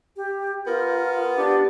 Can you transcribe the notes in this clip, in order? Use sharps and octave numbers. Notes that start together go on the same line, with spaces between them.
G4
B3 F4 A#4
D4 G4